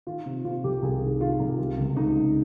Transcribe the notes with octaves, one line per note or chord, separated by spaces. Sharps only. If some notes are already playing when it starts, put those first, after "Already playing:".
D#3 F4
C3
C3 F4
C2 G4
C2 G#4
D#3
D#3 F4
C2
G3
C#2
C#2 D#4
C#2